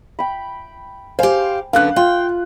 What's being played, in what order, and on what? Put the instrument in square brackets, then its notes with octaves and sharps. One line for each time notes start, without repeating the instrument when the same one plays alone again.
[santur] G5 B5
[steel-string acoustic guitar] G4 F5 [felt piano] C5 G#5
[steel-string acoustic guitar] F#2 D3 B3 [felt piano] F5 F#6
[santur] F4 [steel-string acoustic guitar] G5